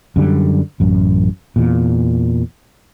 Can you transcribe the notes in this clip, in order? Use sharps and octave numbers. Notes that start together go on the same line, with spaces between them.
F#2 D3 G3
A1 F#2
E2 A#2